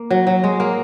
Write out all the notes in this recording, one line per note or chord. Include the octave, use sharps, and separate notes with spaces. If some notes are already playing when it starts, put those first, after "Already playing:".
Already playing: A#3
F#3
F#3
G#3
A#3